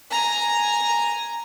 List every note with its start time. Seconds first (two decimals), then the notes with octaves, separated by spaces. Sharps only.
0.11 G#5 A#5